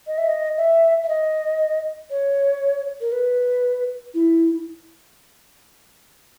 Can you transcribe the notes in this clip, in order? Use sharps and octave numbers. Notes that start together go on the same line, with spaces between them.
D#5
E5
D#5
E5
E5
D#5
C#5
A#4
B4
E4